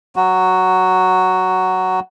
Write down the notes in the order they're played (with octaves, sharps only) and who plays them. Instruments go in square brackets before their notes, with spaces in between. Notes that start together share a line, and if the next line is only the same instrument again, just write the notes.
[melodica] F#3 F#4